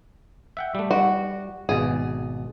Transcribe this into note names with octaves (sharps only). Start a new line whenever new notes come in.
E5 F#5 G5
G3 A3
G3 F#4
G#1 B2 G#4